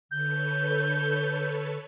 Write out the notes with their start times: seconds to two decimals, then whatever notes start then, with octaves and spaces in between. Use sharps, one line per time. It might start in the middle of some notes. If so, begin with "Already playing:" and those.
0.11 D3 A4 B4 C#5 G6